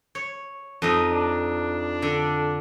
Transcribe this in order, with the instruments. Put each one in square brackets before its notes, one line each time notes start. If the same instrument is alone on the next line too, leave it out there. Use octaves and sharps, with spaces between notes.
[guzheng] C#5
F2 D#4 D#5
[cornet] D4
[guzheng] D3